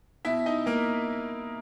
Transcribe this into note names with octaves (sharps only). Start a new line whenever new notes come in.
B2 E4 E5
D#4 D#5
A#3 A#4